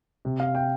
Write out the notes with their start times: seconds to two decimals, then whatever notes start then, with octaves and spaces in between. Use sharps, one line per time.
0.25 C3
0.40 F5
0.55 G5